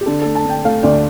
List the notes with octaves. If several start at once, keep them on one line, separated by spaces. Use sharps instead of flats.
G4
D3 A4
A3 A4
A5
D3 G5
A3 F5
D2 D5